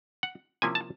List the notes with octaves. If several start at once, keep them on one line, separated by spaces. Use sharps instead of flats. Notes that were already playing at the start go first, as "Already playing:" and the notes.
F#5
C3 F3 A#3 C#4 E4 G#5
A5